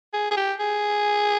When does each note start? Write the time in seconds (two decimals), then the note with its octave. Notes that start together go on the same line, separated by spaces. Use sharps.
0.13 G#4
0.31 G#4
0.37 G4
0.60 G#4